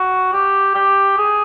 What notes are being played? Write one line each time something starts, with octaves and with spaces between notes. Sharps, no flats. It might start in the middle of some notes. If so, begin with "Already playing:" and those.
Already playing: F#4
G4
G4
G#4